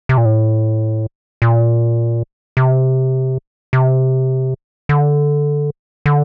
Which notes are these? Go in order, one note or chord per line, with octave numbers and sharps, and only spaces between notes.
C3
A#2
A2
A#2
C3
C3
D3
D3